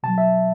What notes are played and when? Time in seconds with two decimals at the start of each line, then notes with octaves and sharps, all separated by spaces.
0.03 B2 F#3 A5
0.18 E5